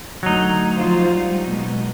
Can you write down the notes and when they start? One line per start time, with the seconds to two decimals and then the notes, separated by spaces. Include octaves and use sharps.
0.23 D2 F#3 A3 D#4
0.76 F3 F4 C5
1.08 G3
1.48 B2 G#3 B3